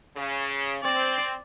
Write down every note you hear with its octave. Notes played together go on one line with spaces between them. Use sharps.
C#3
C4 D5